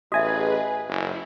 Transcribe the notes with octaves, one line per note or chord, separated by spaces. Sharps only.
A1 F#4 G#4 B4 D#5 E5 G#5
F#1 E4